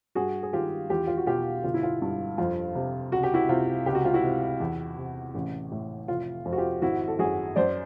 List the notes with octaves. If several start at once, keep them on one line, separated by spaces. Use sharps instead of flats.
G2 F#4 G#4
G#4
D#3 F4 G4
E2 F4 G4
F4
F#4
B2 F4 G4
G1 F4
E4
F4
G2
F2 F4
C3
C#2 F#4
G4
E4 F#4
C3 F4
C#2 G4
F#4
F4
E4 F#4
C3
E2
C3
A1
A2
F1 F4
F2
F#4
F4 G4
G#1 E4 F#4
A4
F#2 F#4 G#4
F#2 C5 D5